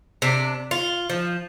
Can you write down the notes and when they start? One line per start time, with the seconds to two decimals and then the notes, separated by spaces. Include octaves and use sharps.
0.22 C3 D4
0.71 F4
1.10 F3